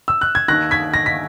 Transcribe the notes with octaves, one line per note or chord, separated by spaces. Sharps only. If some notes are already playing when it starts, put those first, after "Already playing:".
E6
F#6
G#6
D#2 D#3 F#6 A#6
G#6 B6
A#6
B6